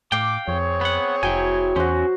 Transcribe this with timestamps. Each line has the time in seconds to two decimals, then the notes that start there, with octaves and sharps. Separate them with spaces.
0.12 A2 F5 G5 D6
0.48 F2 C4 G#4 C#5
0.81 B3 F#5
1.23 F1 F#3 E4 G5 G#5
1.76 E2 C#4 F#4 C5